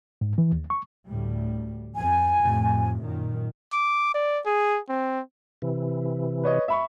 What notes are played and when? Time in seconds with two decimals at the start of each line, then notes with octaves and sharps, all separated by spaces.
0.21 G#2
0.38 E3
0.52 D#2
0.70 C#6
1.09 D2 A2 G3
1.94 F2 G#5
2.43 F2 A2 C3
3.04 F#2 A#2 D#3
3.73 D6
4.14 D5
4.46 G#4
4.89 C4
5.62 C3 E3
6.43 B4 C#5 D#5
6.68 E5 B5 C#6